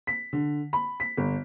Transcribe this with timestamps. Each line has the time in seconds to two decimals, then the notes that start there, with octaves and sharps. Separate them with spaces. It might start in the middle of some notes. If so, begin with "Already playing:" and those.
0.07 B6
0.33 D3
0.73 B5
1.00 B6
1.17 G1